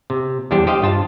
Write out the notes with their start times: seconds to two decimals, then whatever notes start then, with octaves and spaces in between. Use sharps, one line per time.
0.10 C3
0.51 E2 G3 D4 G4 C5
0.67 G4 C5 D#5 F5 G5
0.82 G2 F4 A5